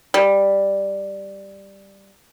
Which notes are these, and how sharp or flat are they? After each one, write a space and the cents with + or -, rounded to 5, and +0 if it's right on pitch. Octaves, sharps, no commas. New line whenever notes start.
G3 +5